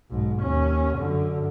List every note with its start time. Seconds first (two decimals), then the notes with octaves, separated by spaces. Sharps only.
0.10 B1 G#2
0.42 D#2 C#4
0.98 F#2 D3